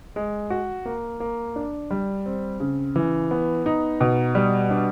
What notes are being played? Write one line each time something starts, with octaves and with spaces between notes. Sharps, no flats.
G#3
F#4
A#3
A#3
D4
G3
C4
C#3
E3
B3
D#4
B2
G3
D4